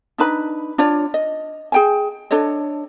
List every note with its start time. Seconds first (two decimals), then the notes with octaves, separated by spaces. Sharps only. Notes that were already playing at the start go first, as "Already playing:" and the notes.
0.18 D4 D#4 B4 B5
0.78 D4 F4 C#5 D5
1.14 D#5
1.72 G#4 G5 G#5
2.31 D4 A4 C#5 D#5